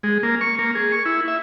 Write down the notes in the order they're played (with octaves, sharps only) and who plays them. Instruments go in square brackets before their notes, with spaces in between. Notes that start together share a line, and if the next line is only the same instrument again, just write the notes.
[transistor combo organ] G#3
A#3
C#6
A#3
G#4
C#6
E4
E5